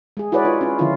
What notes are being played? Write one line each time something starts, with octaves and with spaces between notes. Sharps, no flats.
G#3 G#4
E4 F#4 G#4 B4 C#5 D5
D#4 F4
C#4 F4
D3 D#3 F3 C#4 E4 F4